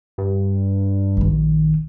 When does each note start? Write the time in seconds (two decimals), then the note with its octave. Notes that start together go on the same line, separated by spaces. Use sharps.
0.18 G2
1.17 A#1 D#3